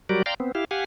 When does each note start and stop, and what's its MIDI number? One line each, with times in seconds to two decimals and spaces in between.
0.09 0.22 54
0.09 0.22 55
0.09 0.22 66
0.09 0.22 67
0.09 0.22 70
0.09 0.22 74
0.26 0.34 74
0.26 0.34 77
0.26 0.34 79
0.26 0.34 82
0.26 0.34 84
0.40 0.52 59
0.40 0.52 60
0.55 0.65 64
0.55 0.65 67
0.55 0.65 77
0.71 0.84 67
0.71 0.84 77
0.71 0.84 78
0.71 0.84 80